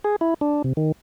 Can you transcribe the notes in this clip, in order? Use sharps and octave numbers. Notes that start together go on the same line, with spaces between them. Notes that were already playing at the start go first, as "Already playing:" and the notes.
G#4
E4
D4
C3
D#3